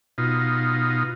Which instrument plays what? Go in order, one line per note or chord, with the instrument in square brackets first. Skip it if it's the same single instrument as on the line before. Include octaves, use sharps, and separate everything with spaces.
[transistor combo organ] B2 D#4 F4